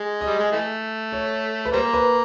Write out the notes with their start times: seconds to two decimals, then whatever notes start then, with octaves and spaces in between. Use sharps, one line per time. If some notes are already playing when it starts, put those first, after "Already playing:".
Already playing: G#3
0.21 D#5
0.26 G3
0.39 G#3
0.52 E3 A3
1.13 C#5
1.65 B4
1.73 G3 A#3 C5
1.94 B4